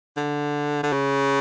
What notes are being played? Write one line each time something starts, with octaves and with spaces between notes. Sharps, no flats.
D3
D3
C#3